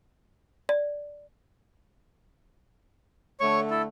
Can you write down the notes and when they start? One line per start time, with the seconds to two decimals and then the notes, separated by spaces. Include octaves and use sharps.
0.69 D5
3.40 D3 A3 C#5 C#6
3.70 E4 A4